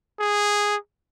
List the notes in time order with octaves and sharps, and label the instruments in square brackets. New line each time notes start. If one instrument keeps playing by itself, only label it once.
[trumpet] G#4